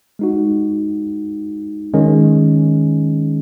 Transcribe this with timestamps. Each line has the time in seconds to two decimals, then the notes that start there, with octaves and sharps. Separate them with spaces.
0.19 G#3 D#4 F#4
1.94 D#3 G#3 C#4